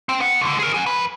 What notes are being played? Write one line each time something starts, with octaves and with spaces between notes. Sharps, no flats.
C4 G5
B3 F#5
C#2 D3
G#4 A#4
F#5 G#5
F2 B4